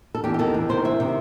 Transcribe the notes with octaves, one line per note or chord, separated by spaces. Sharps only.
A4
E2 G4
G4
C3 D#3 A4
E2
C3 D#3 C5
E2 E5
C3 D#3